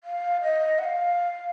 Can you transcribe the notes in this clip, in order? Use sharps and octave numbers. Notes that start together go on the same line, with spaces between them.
F5
D#5
F#5
F5